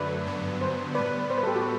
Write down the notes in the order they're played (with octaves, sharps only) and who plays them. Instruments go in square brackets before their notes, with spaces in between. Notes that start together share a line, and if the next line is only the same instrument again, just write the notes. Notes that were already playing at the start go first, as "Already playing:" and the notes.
Already playing: [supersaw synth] F#2 D3 F#3 A3 [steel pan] B4 D5
[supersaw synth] G2 D3 F#3 B3
[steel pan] C5
[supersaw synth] A2 G3 B3 [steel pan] B4 D5
[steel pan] C5
B4
A4
G4
F#4
A4